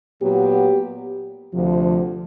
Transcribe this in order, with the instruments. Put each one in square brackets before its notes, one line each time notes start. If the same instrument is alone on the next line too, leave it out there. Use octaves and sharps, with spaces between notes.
[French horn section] A#2 F#3 B3 G4
D2 C3 F3